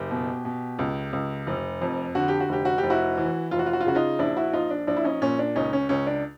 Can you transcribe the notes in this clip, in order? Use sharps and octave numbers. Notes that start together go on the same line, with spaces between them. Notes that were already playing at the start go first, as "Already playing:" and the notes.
Already playing: F#1 G4
B2
B2
C#2
C#2
F1
F2
D3 F#4
G4
F#4
F1 G4
F#4
G4
F1
E4 F#4
E3
F1 F4
F#4
F4
F#4
F4
C#3 F#4
D#4 F4
A#1 D4 E4
E4 F#4
A#1 D#4 F4
D4
A#1 D4
E4
C#4 D#4
A#2 C#4
D4
C#2 C#4 D#4
C#4
C#2 C#4
D4